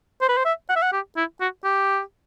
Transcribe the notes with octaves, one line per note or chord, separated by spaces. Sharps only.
C5
B4
C5
E5
F#5
E5
F#5
G4
E4
F#4
G4